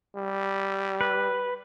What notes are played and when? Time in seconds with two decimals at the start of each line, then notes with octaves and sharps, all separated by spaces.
0.16 G3
1.01 B4